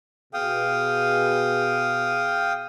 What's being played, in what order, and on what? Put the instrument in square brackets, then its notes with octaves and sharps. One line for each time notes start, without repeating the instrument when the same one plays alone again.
[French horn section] B2 G#4 [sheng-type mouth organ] F5 G5 D#6